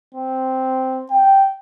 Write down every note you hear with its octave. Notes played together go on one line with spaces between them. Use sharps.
C4
G5